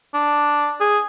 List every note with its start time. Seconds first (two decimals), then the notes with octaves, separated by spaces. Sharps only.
0.14 D4
0.81 G#4